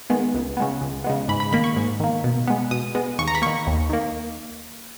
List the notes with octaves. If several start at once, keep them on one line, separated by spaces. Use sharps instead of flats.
D#3 G#3 B3
C#2
C#3 G#3 B3
C#2
C#3 G#3 B3
G#2 B5
B5
D#3 A#3 B5
C#6
G#2
D#3 A#3
B2
G#3 B3
B2 D#6
G#3 B3
D#2 C#6
A#5
B5
D#3 A#3 C#6
D#2
D#3 A#3